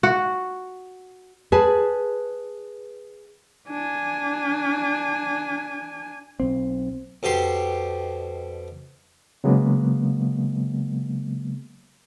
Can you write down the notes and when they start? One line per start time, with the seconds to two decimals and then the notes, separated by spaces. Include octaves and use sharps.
0.03 F#4
1.52 G#4 B4 A5
3.68 D4 G#5
6.40 B1 C4
7.23 F2 B2 G4 C6
9.44 C#3 F#3 G#3 A#3 B3